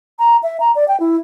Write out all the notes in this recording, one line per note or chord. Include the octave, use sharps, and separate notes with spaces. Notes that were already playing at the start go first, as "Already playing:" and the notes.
A#5
E5
A#5
D5
G5
E4